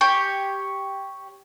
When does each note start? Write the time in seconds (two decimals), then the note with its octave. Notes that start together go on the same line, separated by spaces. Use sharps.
0.01 G4 C#5